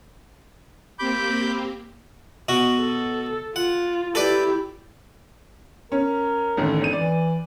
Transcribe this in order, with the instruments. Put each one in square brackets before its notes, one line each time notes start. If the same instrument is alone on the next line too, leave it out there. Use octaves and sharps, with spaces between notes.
[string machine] A#3 C4 G4 [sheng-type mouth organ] B5 D6 G6
[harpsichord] B2 F#4
[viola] A4
[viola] F4 [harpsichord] F#5
[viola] E4 G4 [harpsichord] A4 B4 D5
[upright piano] C#4 [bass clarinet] A#4
[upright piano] A1 D3 D#3
G#1 D#7
[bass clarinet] E3 [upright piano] D5